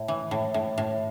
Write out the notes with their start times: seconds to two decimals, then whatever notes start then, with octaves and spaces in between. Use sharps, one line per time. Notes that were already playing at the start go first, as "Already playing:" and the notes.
Already playing: A2
0.08 E3
0.31 A2
0.54 A2
0.78 A2